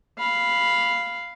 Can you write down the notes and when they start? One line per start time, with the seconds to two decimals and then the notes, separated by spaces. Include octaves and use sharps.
0.17 F5 B5